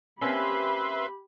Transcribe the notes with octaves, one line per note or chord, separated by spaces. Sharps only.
A#3 C4 C#4 G4 B4 E5 B5 C6